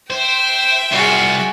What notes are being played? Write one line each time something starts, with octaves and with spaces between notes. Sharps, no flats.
C5 E5 G5
C2 F4 F#4 G#4